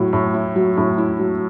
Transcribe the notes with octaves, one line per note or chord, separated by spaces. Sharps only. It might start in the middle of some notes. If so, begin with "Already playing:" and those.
Already playing: A2 F#3
A2
E4
F#3
A2
E4
F#3